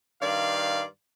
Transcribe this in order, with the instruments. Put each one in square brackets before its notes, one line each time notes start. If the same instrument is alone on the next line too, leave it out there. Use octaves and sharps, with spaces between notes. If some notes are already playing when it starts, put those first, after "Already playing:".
[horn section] G2 D#3 D5 F5